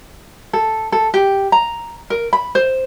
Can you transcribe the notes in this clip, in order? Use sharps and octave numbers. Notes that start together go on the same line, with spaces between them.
A4
A4
G4
A#5
A#4
B5
C5